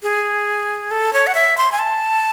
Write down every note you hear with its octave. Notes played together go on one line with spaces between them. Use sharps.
G#4
A4
C#5
F#5
E5
C6
G#5
A5